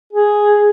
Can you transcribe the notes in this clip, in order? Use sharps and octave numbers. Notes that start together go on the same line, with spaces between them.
G#4